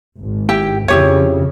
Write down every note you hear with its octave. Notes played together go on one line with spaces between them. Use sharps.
G#1
E4 G4 G5
F2 C#3 E4 G4 C#5